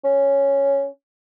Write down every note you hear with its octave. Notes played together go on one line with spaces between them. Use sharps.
C#4